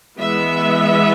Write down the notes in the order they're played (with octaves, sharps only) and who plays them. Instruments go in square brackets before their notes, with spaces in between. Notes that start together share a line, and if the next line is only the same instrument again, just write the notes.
[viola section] E3 G#3 B3 E5